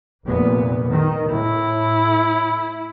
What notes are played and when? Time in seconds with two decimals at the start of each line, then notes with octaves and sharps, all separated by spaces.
0.24 F1 A#2 B3
0.90 D#3
1.33 A2 E4